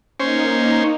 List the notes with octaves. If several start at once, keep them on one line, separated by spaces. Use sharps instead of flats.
A#3 C#4 D#4 C5